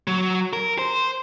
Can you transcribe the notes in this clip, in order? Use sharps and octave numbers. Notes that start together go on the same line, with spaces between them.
F#3
A#4
C5